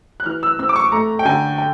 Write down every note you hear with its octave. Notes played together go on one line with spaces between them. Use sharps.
F#6
E3 F6
E6
C4 E6
D6
C#6
A3 A#5
G5
D3 G#5
G5